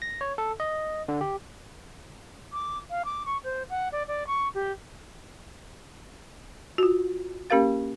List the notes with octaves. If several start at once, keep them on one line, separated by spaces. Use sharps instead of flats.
A#6
C#5
A4
D#5
D3
G4
D6
F5
D6
C#6
C5
F#5
D5
D5
C#6
G4
F4 F#4
A#3 C#4 G4 A#4 F5 A6